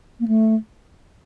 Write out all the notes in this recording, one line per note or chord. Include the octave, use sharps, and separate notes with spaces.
A#3
A3